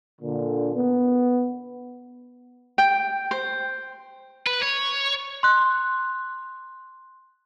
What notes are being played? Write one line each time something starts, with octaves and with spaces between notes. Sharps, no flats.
A#2 D3
B3
G5
C5
B4
C#5
C6 F#6